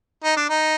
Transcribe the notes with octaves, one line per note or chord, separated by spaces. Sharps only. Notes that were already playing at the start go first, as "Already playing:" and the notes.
D#4
D4
D#4